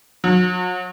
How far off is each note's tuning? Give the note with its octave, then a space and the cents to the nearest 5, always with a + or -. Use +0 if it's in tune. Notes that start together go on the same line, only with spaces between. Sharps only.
F#3 -40